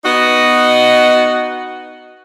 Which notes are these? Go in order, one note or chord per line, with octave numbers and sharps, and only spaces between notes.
B3 D#4 F#4 D#5